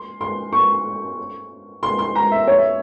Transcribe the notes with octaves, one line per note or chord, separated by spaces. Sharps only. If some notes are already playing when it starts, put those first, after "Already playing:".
Already playing: C6
C6
C#6
C6
C6
A#5
E5
C#5
E5